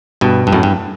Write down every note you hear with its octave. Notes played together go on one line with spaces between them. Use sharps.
G2 B2
G2
F#2 A2
G2